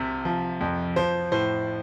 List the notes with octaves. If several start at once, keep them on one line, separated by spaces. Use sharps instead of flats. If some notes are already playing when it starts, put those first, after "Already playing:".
Already playing: C2 C3
F3
F2
F3 C5
A2 C5